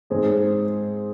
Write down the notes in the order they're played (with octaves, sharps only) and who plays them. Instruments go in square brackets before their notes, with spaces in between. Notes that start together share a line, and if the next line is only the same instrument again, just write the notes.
[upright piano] G#2 G#3 C4 G#4